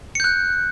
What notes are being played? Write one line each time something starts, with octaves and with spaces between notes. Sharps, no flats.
F#6 G6 C#7